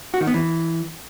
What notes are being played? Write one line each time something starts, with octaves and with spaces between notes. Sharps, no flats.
F#4
D#3
B3
E3